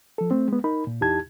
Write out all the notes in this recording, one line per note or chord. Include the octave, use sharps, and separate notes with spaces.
F3 A4
A3 C4
G#3 B3
D#4 A#4 B5
A#2
E2 D#4 E4 G4 A5 G#6